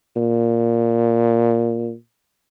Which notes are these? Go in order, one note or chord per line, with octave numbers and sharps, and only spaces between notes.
A#2